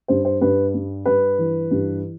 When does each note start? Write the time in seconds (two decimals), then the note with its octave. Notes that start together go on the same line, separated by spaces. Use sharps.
0.08 G2 C5
0.25 C5
0.41 G2 B4
0.74 G3
1.05 G2 B4
1.38 E3
1.71 G2